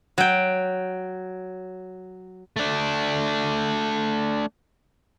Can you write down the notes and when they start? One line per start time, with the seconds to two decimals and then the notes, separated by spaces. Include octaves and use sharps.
0.18 F#3 G5
2.56 A3 D4